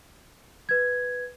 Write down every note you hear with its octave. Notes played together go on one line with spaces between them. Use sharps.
B4 G#6